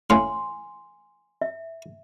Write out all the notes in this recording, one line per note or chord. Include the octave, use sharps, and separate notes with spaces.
A2 C#4 F5 G#5 C6
E5